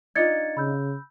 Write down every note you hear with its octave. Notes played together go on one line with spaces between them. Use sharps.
D4 D#4 F4 G#6 A6 C#7
C#3 B5 E6 G6